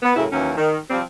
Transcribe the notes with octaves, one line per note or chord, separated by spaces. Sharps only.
B3
F#2 A2 C#3 E4
D#2 E3 F#3 C#4
D#3
C3 F3 G3 C4